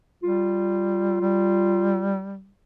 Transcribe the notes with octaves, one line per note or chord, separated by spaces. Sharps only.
G3 F4
G3